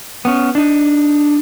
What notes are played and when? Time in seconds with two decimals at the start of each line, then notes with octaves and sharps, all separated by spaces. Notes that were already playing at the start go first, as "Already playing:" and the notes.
0.25 B3 C#4
0.55 D4 D#4